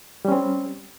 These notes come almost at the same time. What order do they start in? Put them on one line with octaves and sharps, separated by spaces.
G3 C#4 C4